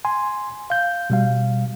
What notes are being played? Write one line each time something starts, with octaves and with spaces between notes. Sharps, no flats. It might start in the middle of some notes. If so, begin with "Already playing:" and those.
G#5 C6
F5 G6
B2 G3 F5